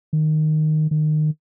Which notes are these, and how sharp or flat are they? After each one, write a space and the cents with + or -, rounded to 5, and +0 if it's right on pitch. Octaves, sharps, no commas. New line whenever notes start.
D#3 -10
D#3 -25